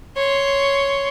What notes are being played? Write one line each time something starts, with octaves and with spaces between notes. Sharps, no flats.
C#5 C6